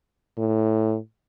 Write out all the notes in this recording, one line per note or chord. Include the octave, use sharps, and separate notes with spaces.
A2